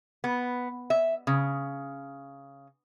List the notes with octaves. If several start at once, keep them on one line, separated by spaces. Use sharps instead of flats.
B3
E5
C#3